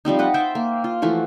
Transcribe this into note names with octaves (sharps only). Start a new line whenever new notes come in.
F3 G3 C4 D#4
B4 D#5 F#5
C5 E5 G5 A5
A#3
F4
E3 F3 A3 F#4